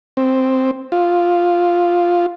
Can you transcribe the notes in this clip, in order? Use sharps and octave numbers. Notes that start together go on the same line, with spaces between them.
C4
F4